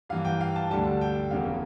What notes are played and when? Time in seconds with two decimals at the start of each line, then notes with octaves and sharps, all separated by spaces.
0.09 G2 E3 A#3 F5
0.25 G5
0.41 F5
0.56 A5
0.71 D2 D3 G3 A5
1.01 G5
1.31 E1 E2 C#3 E3 A#3 F5